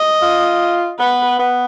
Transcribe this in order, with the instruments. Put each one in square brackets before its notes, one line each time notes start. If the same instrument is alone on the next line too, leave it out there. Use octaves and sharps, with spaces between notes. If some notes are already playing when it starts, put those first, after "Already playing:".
Already playing: [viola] D#5
[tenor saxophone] F4
[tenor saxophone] B3 [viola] B4
[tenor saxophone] B3